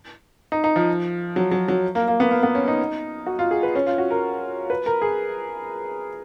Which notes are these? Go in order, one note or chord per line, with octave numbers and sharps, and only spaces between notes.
D#4
D#4
F3
F#3
F#3
F#3
A#3
A#3
B3
A#3
B3
C#4
D#4
F#4
F4
G#4
B4
C#4
F4
F#4
A#4
B4
A#4
G#4